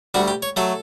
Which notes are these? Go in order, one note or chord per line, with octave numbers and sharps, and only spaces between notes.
D2 D3 G3 F#4
G4
C#5
F#3 A3 A4